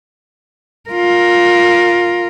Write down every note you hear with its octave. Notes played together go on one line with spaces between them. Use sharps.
F4 A#4